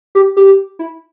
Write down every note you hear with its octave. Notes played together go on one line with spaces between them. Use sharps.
G4
G4
E4